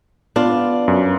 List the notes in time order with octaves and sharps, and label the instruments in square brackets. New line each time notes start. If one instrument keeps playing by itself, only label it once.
[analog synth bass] B3 [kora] D4 F4 [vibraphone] D5 B5
[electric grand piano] F#2